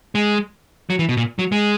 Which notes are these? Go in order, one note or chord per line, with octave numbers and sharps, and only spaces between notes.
G#3
F#3
E3
B2
A#2
F#3
G#3